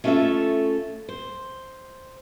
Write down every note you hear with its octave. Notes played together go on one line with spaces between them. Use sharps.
A3 C#4 F4 F#4 A4 E5
C5